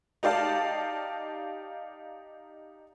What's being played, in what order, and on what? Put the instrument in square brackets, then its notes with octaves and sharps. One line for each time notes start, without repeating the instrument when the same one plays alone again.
[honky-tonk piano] D#4 G4 D5 F5 A5